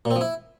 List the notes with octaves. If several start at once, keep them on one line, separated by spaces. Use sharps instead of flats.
A#2
C4
F3
E4